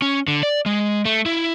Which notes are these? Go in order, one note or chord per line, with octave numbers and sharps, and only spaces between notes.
C#4
D3
D5
G#3
A3
E4